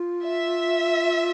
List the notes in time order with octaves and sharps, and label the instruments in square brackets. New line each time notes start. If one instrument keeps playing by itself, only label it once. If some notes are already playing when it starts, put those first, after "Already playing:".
Already playing: [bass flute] F4
[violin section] E5